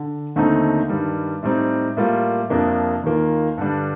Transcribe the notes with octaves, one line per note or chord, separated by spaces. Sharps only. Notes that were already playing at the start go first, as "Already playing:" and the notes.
Already playing: D3
D#2 D3 A3 C4 D#4
G2 D#3 G3
A2 G3 C4 D#4
A2 G3 A#3 F4
F2 C3 F3 A#3 D4
D#2 D#3 A#3 F4
G2 D3 G3 D4